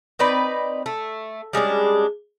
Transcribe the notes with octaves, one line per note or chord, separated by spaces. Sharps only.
C4 D#4 B4 D5
A3
G3 G#3 C#4 D4